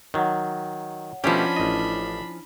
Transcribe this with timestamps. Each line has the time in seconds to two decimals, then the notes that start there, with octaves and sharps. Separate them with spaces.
0.14 D#3 F#3 C#5 F#5
1.24 B2 F3 A3 C#4 D4 G4 B5
1.56 A1 E4 D#5